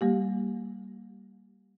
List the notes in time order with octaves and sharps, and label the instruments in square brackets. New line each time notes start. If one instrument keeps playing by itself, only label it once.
[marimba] G3 A#3 G4